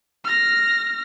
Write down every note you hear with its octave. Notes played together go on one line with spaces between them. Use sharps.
F6 A#6